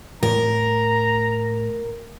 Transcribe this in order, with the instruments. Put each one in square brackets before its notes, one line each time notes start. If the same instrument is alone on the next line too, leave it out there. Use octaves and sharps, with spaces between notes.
[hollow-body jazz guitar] A2 [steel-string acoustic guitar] A#4 [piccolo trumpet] A#5